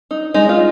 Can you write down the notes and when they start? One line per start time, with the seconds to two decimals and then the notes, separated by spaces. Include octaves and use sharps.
0.11 D#4
0.34 G#3 D#4
0.49 F4